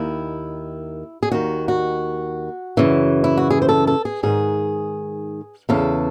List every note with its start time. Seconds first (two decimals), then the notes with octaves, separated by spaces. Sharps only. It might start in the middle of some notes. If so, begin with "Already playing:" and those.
Already playing: D#2 D#3 E4
1.23 G#4
1.31 D#2 D#3 F#4
1.68 F#4
2.77 F#2 C#3 E3
3.24 E4
3.37 F#4
3.50 G#4
3.62 C5
3.69 A4
3.87 A4
4.05 G#4
4.23 G#2 D#3 G#4
5.69 E2 C#3 E3 A4